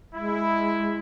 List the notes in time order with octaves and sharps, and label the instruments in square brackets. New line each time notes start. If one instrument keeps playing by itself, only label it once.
[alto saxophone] G#3 [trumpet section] E4